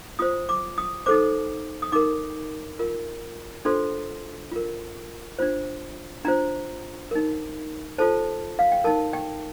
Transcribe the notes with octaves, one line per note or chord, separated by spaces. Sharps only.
F4 C5 D#6
D6
D#6
D#4 A4 C5 D6
D#6
D#4 A#4 D6
F4 A#4
D4 F4 A4 C5 C6
F4 A#4
D4 F4 C5
D4 F4 C5 A#5
D#4 A#4
F4 A4 C5 A5
F5
G5
D#4 A#4 A5
G5